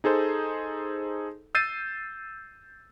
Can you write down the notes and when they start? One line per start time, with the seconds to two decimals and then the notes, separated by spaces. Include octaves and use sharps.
0.04 D#4 G#4 A4 C5
1.55 E6 G6 A6 C7 D#7